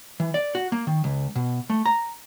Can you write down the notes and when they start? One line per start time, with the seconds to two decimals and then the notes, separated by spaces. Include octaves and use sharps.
0.20 E3
0.34 D5
0.55 F#4
0.72 A#3
0.87 D#3
1.04 C#2
1.35 B2
1.70 A3
1.86 A#5